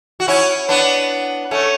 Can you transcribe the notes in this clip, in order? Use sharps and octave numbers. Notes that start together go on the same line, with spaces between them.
F#4
C#4 E4
B3 D4
A3 C#4